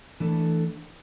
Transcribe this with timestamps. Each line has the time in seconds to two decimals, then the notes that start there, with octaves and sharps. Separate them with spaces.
0.20 E3 A3 D4 A4